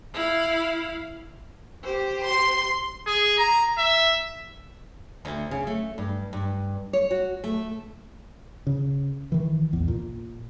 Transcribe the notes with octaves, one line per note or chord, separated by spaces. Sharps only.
E4 F5
G4 C5
C6
G#4
A#5
E5
D2
C#3
A3
G2
G2
C#5
F#4
A3
C#3
D#3 E3
A#1 E2
A#2